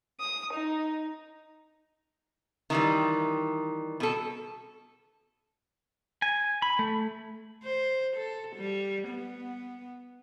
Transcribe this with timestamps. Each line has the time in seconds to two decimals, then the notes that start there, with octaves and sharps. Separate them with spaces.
0.20 D#6
0.54 D#4
2.70 D#3 E3 G3
4.00 B2 A4
6.22 G#5
6.62 B5
6.79 A3
7.64 C5
8.17 A4
8.56 G3
9.08 B3